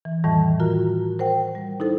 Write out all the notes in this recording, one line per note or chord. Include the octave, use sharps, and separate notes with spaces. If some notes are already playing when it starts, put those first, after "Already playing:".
E3
F2 A2 D#3 E3 G3 A5
F4 F#4 A#4 A#5
A#4 C5 F#5 G5
G3
D#4 E4 A4 C5